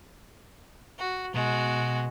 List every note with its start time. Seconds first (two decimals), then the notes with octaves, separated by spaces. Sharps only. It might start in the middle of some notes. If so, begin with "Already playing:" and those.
0.99 F#4
1.35 B2 G#3 F#4